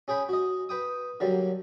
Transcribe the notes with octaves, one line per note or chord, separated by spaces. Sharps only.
C#4 G#4 G5 B5
F#4 D#5
B4 G5 D#6
D3 F#3 G3 A#3